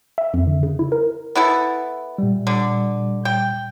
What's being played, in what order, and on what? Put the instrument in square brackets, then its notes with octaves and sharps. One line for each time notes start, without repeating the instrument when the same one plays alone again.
[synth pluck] E5
F2
D3
C#3
E4
A#4
[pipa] B3 E4 A4
[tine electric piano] A#2 G3
[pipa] D3
G5